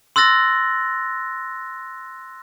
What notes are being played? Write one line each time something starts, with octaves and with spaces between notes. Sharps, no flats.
C6 E6 F#6 A6 A#6